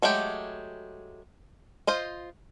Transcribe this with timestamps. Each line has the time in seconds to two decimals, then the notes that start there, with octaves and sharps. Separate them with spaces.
0.02 F#3 G#3 A3 G4
1.87 F4 C5 D#5